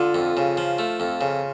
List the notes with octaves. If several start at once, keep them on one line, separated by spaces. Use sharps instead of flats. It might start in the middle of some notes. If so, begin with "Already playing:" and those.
Already playing: D3 F4
F2
C#3
F3
A3
F2
C#3